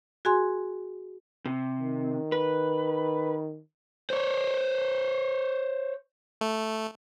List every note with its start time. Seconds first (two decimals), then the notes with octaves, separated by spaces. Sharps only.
0.25 F#4 G#4 G#5 C6
1.46 C3
1.79 D#3
2.32 B4
4.10 C5 C#5
6.41 A3